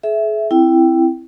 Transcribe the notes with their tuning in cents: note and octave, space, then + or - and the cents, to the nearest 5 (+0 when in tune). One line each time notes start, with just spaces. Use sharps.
G#4 +40 E5 +0
C4 +0 E4 +10 G5 -5